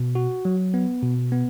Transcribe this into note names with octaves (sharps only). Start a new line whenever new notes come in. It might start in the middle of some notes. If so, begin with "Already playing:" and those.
Already playing: B2
F#4
F#3
B3
B2
B3